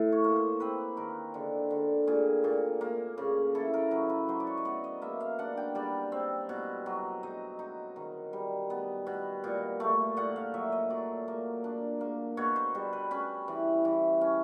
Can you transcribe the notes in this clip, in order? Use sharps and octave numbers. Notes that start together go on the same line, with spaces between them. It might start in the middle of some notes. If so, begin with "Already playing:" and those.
Already playing: A2 F5
C#5
A#3
C5
C4 B4
D#3 A#4
D3
D3
A#2 G#4
A#2
A#3
C#3
E4 A4
A#4
F#3 B4
B4
F#3 C5
D5
C#5
D#5
B3 D5
D#5
A#3 E5
F5
D4 F#5
G5
G3 D5
C4
B2
F#3
D#4 D#5
D#4
D#3
G3
B3
B2
A#2
A3
A#2 F#5
F5
F#3 E5
D#5
F#3 D5
A#3
D4
A#3
B2 C#5
C5
G3
B4
C#4 B4
E3
E3
C#4